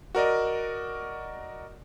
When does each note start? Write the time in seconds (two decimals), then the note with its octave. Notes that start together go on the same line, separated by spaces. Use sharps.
0.15 F#4 A#4 D5 D#5